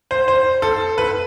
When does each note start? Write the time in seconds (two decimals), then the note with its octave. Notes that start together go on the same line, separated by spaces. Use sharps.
0.11 C5
0.28 C5
0.62 A4
0.98 B4